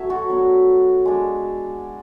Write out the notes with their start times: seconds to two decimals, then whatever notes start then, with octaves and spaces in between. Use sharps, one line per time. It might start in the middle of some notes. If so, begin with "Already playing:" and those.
Already playing: F#3 A3 C#4 C#5 E5
0.09 F#4 A4
0.29 F#3 B3 D4
1.05 G#3 D4